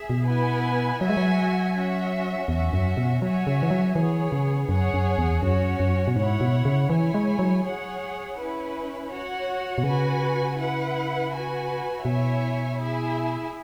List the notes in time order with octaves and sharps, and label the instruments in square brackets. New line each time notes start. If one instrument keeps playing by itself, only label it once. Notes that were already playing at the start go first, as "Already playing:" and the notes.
Already playing: [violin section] G#4 E5
[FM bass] B2
[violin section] B3 E4 B4 G#5
[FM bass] F#3 [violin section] F#4 E5 G#5
[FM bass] G#3
F#3
[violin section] C#4 F#4 E5
[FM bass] E2 [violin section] C#4 F#4 E5
[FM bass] F#2
B2
[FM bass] F#3 [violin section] F#4 C#5 E5 G#5
[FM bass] C#3
E3
F#3
[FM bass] E3 [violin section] B3 G#4 C#5
[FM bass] C#3
[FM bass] F#2 [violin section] G#4 C#5 F#5
[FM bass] F#2
E2
[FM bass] F#2 [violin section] C#4 F#4 C#5
[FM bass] F#2
B2
[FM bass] G#2 [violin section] E4 C#5 F#5
[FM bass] B2
C#3
[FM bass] E3 [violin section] E4 C#5 G#5
[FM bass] G#3
F#3
[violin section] G#4 C#5 F#5
C#4 E4 B4
F#4 C#5 F#5
[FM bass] B2
[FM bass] C#3 [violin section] F#4 B4 G#5
[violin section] E4 B4 F#5
F#4 B4 G#5
[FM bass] B2 [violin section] E4 C#5 E5 G#5
[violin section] E4 G#4 E5 G#5